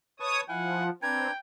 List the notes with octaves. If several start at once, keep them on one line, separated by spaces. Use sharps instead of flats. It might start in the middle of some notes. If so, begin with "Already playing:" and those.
B4 C#5 A5 C#6 D#6
F3 E4 F5 F#5 G#5
C4 D4 B4 G5 A#5 G#6